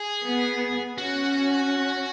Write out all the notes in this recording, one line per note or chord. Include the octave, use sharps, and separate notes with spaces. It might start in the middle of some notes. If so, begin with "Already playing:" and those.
Already playing: G#4
B3
C#4 F#4